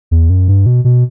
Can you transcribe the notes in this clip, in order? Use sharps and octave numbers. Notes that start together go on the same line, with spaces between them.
E2
F#2
G2
B2
B2